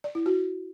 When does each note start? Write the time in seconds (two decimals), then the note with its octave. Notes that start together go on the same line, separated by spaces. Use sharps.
0.04 D5
0.15 E4
0.26 F#4